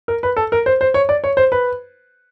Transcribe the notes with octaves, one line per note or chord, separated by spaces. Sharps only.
A#4
B4
A4
A#4
C5
C5
C#5
D5
C#5
C5
B4